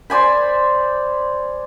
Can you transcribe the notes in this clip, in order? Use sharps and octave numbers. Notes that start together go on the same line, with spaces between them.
C5 D5 G#5 B5